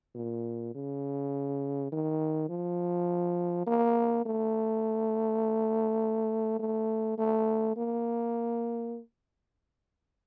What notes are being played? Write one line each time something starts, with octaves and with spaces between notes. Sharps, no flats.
A#2
C#3
D#3
F3
A#3
A3
A3
A3
A#3